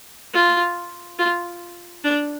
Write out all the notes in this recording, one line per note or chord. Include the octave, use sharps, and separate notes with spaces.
F4
F4
D4